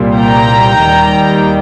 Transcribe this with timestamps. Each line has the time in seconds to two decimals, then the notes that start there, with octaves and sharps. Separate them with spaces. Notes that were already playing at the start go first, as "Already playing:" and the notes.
Already playing: C2 A#2 G3
0.18 G5 A#5
0.80 D#2 D#3 G3